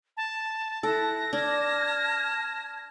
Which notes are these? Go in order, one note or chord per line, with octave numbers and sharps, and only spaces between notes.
A5
E4 A4 F#6 A#6
D4 A5 F6 G#6